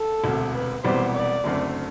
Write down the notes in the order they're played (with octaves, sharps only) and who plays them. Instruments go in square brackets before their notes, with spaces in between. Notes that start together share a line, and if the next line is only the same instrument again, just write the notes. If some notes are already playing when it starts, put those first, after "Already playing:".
Already playing: [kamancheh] A4
[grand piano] E1 D2 C3
[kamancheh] B4
[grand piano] E1 E2 C3 G3 B3 [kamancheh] C5
[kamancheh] D5
[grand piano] F#1 F#2 D3 A3 C4